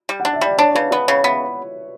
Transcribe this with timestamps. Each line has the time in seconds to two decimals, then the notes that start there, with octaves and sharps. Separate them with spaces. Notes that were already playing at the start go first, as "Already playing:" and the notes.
0.09 G3
0.20 F#5
0.25 D4
0.33 E5
0.41 G3 D5
0.58 D4 C#5
0.70 C#5
0.75 C#3 B4
0.91 B3 B4
1.08 C#3 C#5
1.24 B3 E5